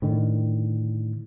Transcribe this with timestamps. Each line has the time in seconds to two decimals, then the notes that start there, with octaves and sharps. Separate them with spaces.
0.02 A2 D3 D#3